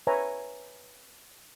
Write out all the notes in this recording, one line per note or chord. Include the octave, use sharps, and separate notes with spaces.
B4 C#5 E5 G#5 A#5